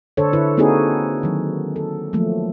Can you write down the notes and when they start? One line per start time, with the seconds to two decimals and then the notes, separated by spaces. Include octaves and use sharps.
0.17 D3 D4 A4 C5 C#5
0.33 D3 E4 B4
0.57 A#3 C4 D#4 F#4 G#4 A4
1.23 D#3 F#3
1.76 A4
2.13 F3 F#3 A3 A#3